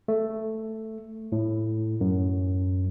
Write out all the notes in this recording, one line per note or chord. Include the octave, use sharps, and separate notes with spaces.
A3
A2
F#2